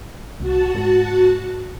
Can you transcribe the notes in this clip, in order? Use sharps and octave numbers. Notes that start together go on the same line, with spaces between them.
C2 F#4 A5
G#2